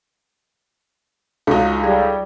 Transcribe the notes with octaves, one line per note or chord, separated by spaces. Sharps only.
C#2 A3 D4 D#4 F#4
G3 G#4